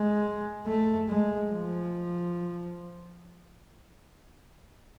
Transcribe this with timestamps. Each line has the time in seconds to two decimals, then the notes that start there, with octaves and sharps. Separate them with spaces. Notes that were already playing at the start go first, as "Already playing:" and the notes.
Already playing: G#3
0.67 A3
1.08 G#3
1.50 F3